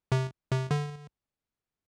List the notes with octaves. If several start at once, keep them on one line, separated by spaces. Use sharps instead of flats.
C3
C3
D3